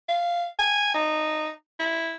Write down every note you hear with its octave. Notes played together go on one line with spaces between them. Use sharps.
F5
G#5
D#4
E4